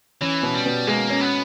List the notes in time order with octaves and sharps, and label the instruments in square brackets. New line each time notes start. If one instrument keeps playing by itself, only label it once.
[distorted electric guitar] E3 [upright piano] C#4
[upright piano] B2
[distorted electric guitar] G3
[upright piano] B2
[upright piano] G#3 [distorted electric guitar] A#3
[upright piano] C#4
[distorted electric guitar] B3